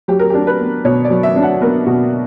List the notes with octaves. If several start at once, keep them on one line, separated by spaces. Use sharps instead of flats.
F#3 G4
A#4
D4 G4
B4
B3
B2 C#5
D5
F#3
E5
D4
F#5
B3 A#4
B2 F#4